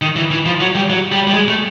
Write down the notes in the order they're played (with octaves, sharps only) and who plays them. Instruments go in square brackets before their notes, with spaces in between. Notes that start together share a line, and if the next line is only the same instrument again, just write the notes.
[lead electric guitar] D#3
E3
E3
F3
F#3
G3
F#3
G3
G3
G#3
A3